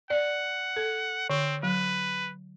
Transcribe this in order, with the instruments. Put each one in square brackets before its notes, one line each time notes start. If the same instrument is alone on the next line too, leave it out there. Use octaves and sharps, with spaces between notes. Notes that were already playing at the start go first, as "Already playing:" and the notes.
[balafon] D5 [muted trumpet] F#5
[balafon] A4
[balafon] D3 [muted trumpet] C4
[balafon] F#3 [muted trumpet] B4